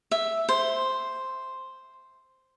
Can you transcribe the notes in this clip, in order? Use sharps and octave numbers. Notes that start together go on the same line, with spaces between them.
E5
C5